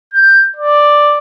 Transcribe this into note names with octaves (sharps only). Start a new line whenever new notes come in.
G6
D5